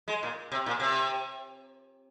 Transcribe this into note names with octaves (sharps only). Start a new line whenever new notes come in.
G#3
A#2
C3
A#2
C3